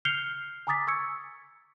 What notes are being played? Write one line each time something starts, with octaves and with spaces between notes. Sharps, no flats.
F6 G6 C7 C#7 F7 G7
G#5 A#5 D6 D#6 A6 B6
C#6 E6 G#6 C#7